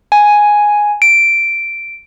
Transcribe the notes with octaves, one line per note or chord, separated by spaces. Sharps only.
G#5
D7